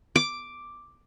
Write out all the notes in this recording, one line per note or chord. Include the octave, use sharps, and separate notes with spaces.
D6